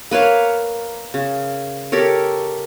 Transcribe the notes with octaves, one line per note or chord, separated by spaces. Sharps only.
A#3 B4 C#5 F5
C#3
G4 A4 A#4 C#5